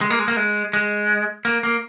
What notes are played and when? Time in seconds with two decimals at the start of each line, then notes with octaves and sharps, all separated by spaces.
0.01 G#3
0.10 A#3
0.19 G#3
0.28 A#3
0.37 G#3
0.73 G#3
1.45 A#3
1.63 A#3